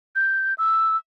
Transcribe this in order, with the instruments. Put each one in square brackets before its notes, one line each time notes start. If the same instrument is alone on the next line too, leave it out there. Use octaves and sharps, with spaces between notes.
[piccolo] G6
E6